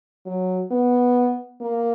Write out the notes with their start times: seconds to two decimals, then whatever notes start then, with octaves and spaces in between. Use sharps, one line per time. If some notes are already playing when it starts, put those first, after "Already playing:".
0.26 F#3
0.71 B3
1.61 A#3